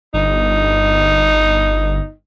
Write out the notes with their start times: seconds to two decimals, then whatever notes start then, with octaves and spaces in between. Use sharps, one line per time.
0.14 G1 D#4